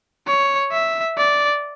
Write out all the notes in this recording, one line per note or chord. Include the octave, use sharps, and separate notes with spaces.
C#5
E5
D5